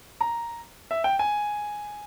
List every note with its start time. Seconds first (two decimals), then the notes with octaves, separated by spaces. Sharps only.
0.21 A#5
0.91 E5
1.04 G5
1.19 G#5